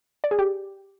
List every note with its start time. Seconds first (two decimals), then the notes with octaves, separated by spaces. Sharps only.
0.24 D5
0.31 G#4
0.39 G4